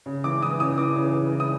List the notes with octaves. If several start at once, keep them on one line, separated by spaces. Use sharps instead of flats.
C#3
E3 D6
E3 D#6
C#3 D#6
E3 D6
C#3
C#3
E3
D#6